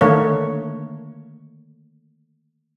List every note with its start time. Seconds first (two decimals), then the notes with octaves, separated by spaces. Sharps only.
0.01 D3 D#3 A3 A#3 C#5